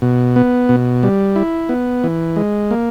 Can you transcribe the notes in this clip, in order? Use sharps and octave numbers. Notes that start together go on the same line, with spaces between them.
B2
B3
B2
G3
E4
B3
E3
G#3
A#3